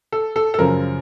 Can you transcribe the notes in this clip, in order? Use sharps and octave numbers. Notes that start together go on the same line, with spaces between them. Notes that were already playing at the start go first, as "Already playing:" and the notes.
A4
A4
A4
F#2 C#3 F3 A#4